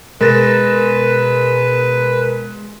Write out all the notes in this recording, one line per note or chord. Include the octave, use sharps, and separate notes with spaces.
B2 G#3 A#4 B4 A6 A#6 E7